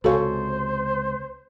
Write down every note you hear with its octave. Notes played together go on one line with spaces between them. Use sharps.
C#2 C3 F#4 A4 C5 C#5 F5 G#5